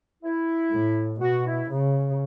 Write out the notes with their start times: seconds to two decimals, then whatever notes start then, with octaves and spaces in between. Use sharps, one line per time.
0.24 E4
0.72 A2
1.20 B2 F#4
1.46 E4
1.70 C#3